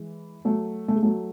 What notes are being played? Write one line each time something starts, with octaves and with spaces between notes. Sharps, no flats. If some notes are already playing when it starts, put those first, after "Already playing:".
Already playing: E3 G#3
F#3 A3
A3
G#3
F#3 A3